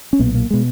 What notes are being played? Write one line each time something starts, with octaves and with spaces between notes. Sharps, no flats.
C#4
B1 A#2 B3
A#3
B2 G#3